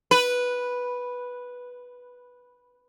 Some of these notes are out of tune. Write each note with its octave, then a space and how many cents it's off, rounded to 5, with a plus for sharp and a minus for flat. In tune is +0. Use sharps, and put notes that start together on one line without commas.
B4 -5